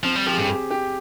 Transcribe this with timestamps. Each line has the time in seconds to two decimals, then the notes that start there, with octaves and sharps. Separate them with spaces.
0.04 F3 C4
0.16 G3
0.27 F3 G4
0.33 G#4
0.38 G2 G4
0.49 G4
0.71 G4